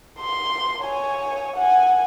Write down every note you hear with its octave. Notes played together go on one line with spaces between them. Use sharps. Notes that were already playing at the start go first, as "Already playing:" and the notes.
C6
C#5 G#5
F#5 G#5